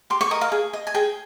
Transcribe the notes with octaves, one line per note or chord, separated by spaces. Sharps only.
G4 C6
C#6
A#4 D#5 D#6
F5
G#4
D#5
G#5
G#4 G5